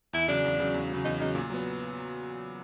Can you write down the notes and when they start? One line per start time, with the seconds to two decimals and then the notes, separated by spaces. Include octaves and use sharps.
0.13 E2 E4
0.28 C#3 F#3 D4
0.45 E2
0.60 C#3 F#3
0.74 E2
0.90 C#3 F#3
1.04 E2 D#4
1.20 C#3 F#3 D#4
1.35 A#2
1.50 F#3 B3